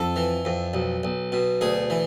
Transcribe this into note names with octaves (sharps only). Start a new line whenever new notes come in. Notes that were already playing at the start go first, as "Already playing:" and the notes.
Already playing: F2 A4
E3
F2
B1
B1
B2
D2 G#4
E3